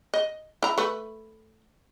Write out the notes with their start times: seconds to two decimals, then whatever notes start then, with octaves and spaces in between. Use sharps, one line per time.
0.14 D#5
0.63 E4 A#5
0.78 A3 B4